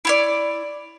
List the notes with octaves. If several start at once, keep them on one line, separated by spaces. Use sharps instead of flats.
E4 C#5 D5